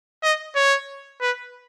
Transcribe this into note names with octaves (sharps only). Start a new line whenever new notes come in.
D#5
C#5
B4